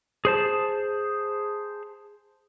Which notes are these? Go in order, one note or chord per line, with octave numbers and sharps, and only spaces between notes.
G#4 C5 A5